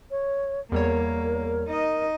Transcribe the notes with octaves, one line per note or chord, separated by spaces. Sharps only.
C#5
E2 G3 A#3 A#4 C#5
D#4 D#5